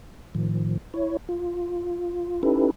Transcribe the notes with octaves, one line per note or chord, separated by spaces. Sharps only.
A2 D#3 F3
E4 C#5
F4
C#4 D#4 E4 G4 A4 B4